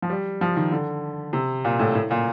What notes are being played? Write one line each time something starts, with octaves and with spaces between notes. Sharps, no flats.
F3
G3
F3
D#3
D3
C3
A#2
A2
A2
A#2